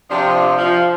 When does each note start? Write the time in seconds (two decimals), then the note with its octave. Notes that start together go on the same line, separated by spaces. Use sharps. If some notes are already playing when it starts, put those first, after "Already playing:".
0.10 C3 F3 D4
0.58 F3